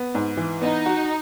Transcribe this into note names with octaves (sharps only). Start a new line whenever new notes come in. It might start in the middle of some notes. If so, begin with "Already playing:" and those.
Already playing: B3
G#2
E3
B3 D#4
F#4